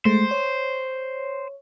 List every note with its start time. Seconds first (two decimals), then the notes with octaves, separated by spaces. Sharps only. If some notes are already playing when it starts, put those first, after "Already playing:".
0.05 G#3 A3 C5
0.31 C#5